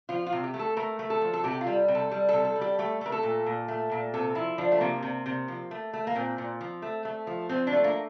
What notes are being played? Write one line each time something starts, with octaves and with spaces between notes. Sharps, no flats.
F3 F4
F4
C3
G4
A3
A4
A3 A#4
A3
A4
F3
A4
C3 G4
F4
G3
C3
A4
G3
C3 A4
A4
G3
G4
A3 G4
A3 A#4
A4
A#2
A#2
A3
A#2
C3 A4
F3 E4
F3 D4
A3
C3 A#3
C3
C3
F3
A3
A3
A#3
A#2 C4
A#2
F3
A3
A3
F3
F3 C4
D4
A3
A#3